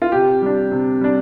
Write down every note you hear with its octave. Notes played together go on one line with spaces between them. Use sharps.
F4
C3 G4
G3 D4
C3
G3 D4